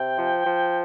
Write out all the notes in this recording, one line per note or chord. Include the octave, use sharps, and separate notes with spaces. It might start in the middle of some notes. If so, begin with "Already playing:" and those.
Already playing: C3 G5
F3
F3